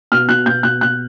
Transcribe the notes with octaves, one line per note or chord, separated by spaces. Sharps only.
B2 F6
B2 F#6
B2 G6
B2 F#6
B2 F#6